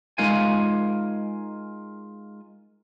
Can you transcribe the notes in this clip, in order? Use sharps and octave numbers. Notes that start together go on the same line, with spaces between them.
G#3 D#4 F4 A#4 F5 G#5